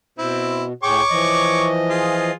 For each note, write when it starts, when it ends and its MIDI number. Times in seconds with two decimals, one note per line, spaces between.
0.18 0.73 47
0.18 0.64 60
0.18 0.64 64
0.83 1.02 45
0.83 1.02 68
0.83 1.68 73
0.83 1.02 79
0.83 1.68 85
0.83 1.68 86
1.10 2.31 52
1.10 2.31 53
1.10 2.31 75
1.90 2.33 65
1.90 2.33 68